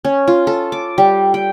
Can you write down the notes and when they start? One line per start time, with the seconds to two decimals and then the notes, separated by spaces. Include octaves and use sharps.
0.05 C#4
0.28 F4
0.47 A4
0.72 D6
0.98 G3
1.34 G5